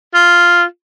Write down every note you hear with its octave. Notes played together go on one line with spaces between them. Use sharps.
F4